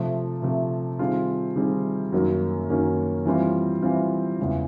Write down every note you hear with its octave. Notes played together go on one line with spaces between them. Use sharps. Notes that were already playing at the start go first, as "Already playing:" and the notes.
Already playing: C3 F3 A3
C3 F3 A3
D#3 G3 C4 F4 G#4
D#3 G3 C4 F4 G#4
F#2 D#3 F#3 A#3 C#4
F#2 D#3 F#3 A#3 C#4
E3 G3 C4 F4
E3 G3 C4 F4
E2 C#3 E3 G#3